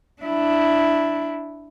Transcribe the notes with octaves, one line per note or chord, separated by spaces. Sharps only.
D4 E4